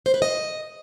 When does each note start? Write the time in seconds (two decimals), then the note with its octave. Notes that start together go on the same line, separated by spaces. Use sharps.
0.06 C5
0.14 B4
0.22 D#5